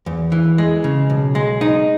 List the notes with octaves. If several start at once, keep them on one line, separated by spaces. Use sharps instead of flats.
E2
E3
G#3
C#3
B1
G#3
D#4